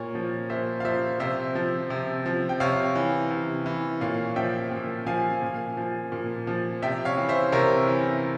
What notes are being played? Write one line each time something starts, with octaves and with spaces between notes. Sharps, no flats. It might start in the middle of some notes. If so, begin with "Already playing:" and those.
Already playing: A#2 A#4 C#5
F3
A#2 C5 E5
F5
F3 C5 E5
C3 C5 E5
F3
C3
F3
G5
C3 C#5 F5
E3
C3
E3
A#2 C#5 F5
F3 E5 G5
A#2
F3 F5 G#5
A#2
F3
A#2
F3
C3 E5 G5
C#5 F5
E3
C5 E5
C3 A#4 C#5
E3